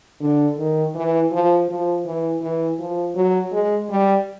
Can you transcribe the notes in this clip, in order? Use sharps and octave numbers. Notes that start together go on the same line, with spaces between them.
D3
D#3
E3
F3
F3
E3
E3
F3
F#3
G#3
G3